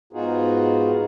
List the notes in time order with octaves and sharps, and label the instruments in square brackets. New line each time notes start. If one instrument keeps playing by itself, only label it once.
[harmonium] G#2 B3 D#4 F4 F#4 G#4